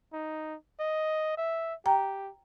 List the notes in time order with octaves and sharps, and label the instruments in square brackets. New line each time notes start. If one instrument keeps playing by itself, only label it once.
[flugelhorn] D#4
D#5
E5
[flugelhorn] G4 [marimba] G5 A#5